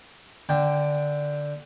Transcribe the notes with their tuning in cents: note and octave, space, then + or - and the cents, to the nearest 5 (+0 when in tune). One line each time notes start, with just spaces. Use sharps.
D3 +0 G5 +5